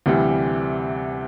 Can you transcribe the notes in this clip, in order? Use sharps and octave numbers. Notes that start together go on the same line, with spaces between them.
D2 C3 E3 G3